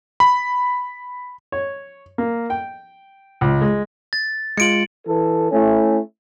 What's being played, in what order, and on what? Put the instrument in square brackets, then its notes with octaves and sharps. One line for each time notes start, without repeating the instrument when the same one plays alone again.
[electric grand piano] B5
[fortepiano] C#5
A#3
G5
C#2
G#3
[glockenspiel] A6
[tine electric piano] G#3 F4 [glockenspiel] C#7 D7 F#7
[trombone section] E3 A4
A3 C#4 E4